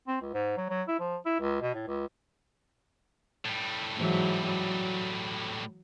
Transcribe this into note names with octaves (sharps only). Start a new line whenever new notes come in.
C4
C#2
G#2
F#3
F#3
E4
F3
E4
C#2
B2
A2
C#2
A2 G3
G#2 E3 F#3
F#3